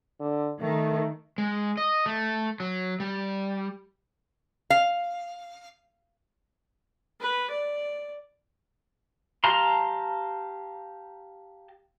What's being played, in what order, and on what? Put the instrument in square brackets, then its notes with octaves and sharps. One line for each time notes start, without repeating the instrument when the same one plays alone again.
[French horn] D3
[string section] D#3 [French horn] A3
[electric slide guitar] G#3
D#5
A3
F#3
G3
[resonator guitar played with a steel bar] F5
[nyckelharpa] B4
D5
[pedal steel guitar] G4 F5 A5 A#5 C6